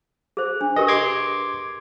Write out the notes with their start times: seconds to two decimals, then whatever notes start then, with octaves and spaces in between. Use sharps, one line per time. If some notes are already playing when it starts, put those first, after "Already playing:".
0.37 G#4 C5
0.61 D4
0.76 G4 A#4 B4 D#5
0.88 C6 D6 G#6